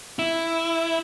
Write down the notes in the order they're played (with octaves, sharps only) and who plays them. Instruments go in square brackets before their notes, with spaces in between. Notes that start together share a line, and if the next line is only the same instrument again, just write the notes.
[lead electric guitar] E4